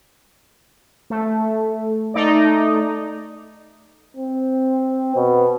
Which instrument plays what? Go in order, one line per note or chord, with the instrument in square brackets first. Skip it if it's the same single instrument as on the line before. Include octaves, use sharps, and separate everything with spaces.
[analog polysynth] A3
A3 D#4 D5
[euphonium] C4
B2